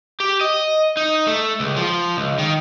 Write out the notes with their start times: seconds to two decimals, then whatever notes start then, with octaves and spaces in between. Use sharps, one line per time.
0.20 G4
0.41 D#5
0.97 D#4
1.27 A3
1.60 C#2
1.76 F3
2.17 C#2
2.38 D#3